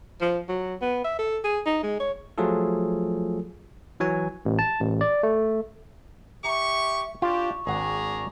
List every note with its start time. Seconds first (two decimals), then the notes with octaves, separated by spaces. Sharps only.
0.21 F3
0.49 F#3
0.82 B3
1.05 E5
1.19 A4
1.44 G#4
1.66 D#4
1.83 G#3
2.00 C#5
2.38 F3 F#3 A3 F4 G#4 A4
4.00 E3 F#3 C#5 G#5
4.45 A1
4.59 A5
4.80 A1
5.01 D5
5.23 A3
6.44 G4 E5 A#5 C#6
7.22 D4 F4 G4 C#6
7.67 G#1 D4 G#4 F#5 A#5